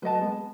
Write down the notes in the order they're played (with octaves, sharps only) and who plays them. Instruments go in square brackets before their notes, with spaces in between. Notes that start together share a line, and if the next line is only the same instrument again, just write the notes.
[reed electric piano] F#3 A3 [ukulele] B4 D#5 A5
[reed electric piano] G#3 B3